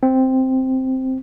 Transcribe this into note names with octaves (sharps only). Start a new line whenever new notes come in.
C4